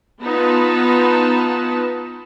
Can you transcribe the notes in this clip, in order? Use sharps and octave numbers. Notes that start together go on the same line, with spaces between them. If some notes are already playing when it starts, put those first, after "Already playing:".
B3 D#4 F4 B4 A5